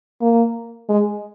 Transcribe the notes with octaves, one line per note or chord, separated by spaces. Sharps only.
A#3
G#3